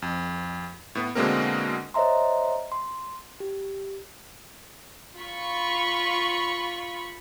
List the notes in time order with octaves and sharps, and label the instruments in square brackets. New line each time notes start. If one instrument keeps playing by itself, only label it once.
[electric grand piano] F2
A2 B3
B2 D3 G#3 A#3 C4 A#4
[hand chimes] C5 C#5 D#5 E5 A#5 C6
C6
G4
[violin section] F4 B5 C#6